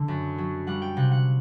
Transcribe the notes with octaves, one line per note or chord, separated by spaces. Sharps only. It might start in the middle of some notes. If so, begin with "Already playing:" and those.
Already playing: D3
F#2
F#3
G3 F#5
G5
C3 F#5
F#5